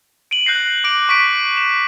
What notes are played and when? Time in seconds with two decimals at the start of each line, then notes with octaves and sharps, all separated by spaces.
0.31 D7 D#7 F#7
0.46 F#6 G6 A#6 C7
0.84 D6 A#6 D7
1.09 C#6 B6 D7
1.57 E7